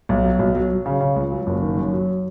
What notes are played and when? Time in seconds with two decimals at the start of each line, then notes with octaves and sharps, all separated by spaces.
0.09 B1
0.24 F#3
0.39 B1
0.55 F#3
0.70 F#3
0.86 C#3
1.01 C#3
1.16 C#2
1.31 F#3
1.47 F#1
1.62 D#3
1.78 F#2
1.93 F#3